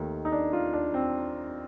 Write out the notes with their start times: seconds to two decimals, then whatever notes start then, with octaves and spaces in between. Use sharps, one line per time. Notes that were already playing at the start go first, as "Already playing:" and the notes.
Already playing: D#2 D#3 A3
0.25 D#4
0.32 D4
0.53 F4
0.73 D4
0.94 C4